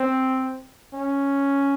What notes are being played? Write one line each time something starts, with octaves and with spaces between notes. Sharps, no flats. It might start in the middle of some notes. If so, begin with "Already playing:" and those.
Already playing: C4
C#4